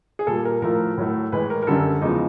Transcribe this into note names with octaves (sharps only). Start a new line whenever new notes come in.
G#4
A#2 G3 A4
A#4
A2 F3 A3 A#4
A2 F#3 A3
A2 E3 G#3 B4
A#4
A#4
F#2 D3 G3 A4
E2 C#3 F3 G#3 D#4